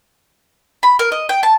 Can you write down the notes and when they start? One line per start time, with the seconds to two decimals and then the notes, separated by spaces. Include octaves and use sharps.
0.83 B5
0.99 A#4
1.12 D#5
1.29 G5
1.43 A5